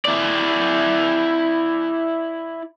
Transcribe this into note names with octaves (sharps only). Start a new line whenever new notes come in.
E4 D5